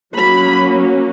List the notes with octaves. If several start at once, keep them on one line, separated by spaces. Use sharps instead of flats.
F#3 A#3 C#4 B5